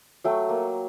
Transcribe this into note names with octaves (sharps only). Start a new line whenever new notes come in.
F#3 A3 G5
A#3